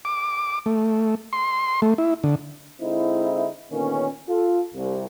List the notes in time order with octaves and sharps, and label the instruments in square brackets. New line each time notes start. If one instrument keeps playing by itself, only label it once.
[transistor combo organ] D6
A3
C6
A3
E4
D3
[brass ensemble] D3 G#3 C4 D#4 E4
A#2 D3 D#3 A#3 B3 C#4
F4 A4
C2